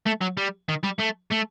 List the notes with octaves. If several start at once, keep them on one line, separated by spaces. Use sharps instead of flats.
A3
F#3
G3
D#3
G3
A3
A3